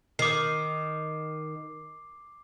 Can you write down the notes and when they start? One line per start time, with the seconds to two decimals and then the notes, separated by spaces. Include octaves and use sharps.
0.19 D#3 D6 C7